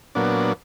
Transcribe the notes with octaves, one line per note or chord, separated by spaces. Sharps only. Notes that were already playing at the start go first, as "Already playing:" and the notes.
A#2 F#3 B3 D4